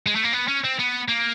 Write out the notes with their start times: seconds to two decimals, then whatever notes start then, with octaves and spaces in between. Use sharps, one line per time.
0.07 G#3
0.15 A3
0.24 A#3
0.33 B3
0.48 C#4
0.64 C4
0.79 B3
1.08 A#3